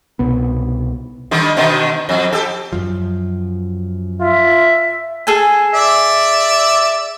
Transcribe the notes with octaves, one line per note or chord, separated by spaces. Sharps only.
C2 B2 B3
D3 D#3 G3
B2 D3 D#3
F2 F#3
G4 A4
F#2 F3
F4 E5
G#4 A4 G#5
D5 E5